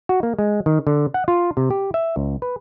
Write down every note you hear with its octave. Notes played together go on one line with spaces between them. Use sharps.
F#4
A#3
G#3
D#3
D3
F#5
F4
C3
G4
E5
C#2
B4